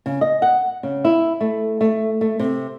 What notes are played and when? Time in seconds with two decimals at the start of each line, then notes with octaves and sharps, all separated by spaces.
0.06 C#3
0.21 D#5
0.42 F#5
0.83 C#3
1.05 E4
1.41 A3
1.81 A3
2.21 A3
2.39 C3